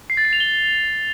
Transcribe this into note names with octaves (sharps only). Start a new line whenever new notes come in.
C7
A6
C7
F7
G7